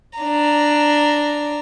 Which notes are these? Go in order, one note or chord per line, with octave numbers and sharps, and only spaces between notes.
D4 A#5